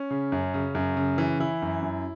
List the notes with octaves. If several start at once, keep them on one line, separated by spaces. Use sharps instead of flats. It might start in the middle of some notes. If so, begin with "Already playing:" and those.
Already playing: C#4
C#3
F#2
C#3
F#2
C#3
E3
E3 E4
F#2
F#2